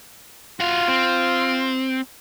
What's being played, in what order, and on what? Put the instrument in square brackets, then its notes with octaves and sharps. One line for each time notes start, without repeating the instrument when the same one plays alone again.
[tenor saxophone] F4 [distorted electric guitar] F#4 F5
[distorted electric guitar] C4